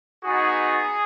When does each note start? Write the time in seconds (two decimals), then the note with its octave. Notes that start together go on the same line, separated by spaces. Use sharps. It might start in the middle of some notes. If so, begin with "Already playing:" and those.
0.23 B3 D#4 F#4 G#4